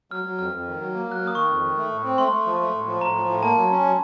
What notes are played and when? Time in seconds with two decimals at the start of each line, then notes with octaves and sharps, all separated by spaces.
0.11 F#3 F6
0.24 F#3
0.39 F2 F6
0.53 F2
0.67 D#3
0.80 F#3
0.94 A#3
1.08 F#3 F#6
1.19 A#3 F6
1.27 D#6
1.35 D#3 C#6
1.49 F2
1.63 D#3
1.78 A3
1.91 A2
2.04 C4
2.18 A3 C6
2.32 A3
2.46 F3
2.60 A3
2.73 A2
2.87 F3
3.01 A2 A#5
3.16 F3
3.29 A2
3.43 A#3 A5
3.57 F#3
3.71 C#4
3.84 F#3